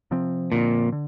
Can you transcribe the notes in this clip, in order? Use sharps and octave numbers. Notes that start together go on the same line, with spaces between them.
C3 F3 C4
A#2 D3 F3 C4
D3